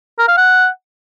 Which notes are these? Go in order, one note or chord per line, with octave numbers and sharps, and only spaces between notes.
A#4
F5
F#5